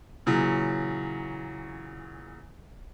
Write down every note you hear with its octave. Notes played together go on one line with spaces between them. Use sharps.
A#2 C#3 E3 F#3